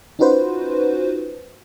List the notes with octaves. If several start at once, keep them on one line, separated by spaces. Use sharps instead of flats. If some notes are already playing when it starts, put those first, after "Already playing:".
C#4 D#4 F4 F#4 B4 C5